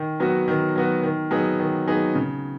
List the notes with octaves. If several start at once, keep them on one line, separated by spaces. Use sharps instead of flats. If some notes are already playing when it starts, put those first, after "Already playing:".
Already playing: D#3
F#3 B3 F#4
D#3
F#3 B3 F#4
D#3
F#3 B3 D#4 G#4
D#3
F#3 B3 D#4 G#4
C#3